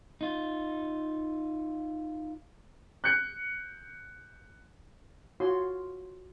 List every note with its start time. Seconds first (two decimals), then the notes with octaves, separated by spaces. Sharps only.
0.21 D#4 F4
3.04 F#6 G6 C#7
5.40 F4 F#4 C#5 C6